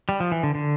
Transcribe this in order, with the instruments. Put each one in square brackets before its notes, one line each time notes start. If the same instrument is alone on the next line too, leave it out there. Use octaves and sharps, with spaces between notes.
[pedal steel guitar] G3
F3
E3
D3
D3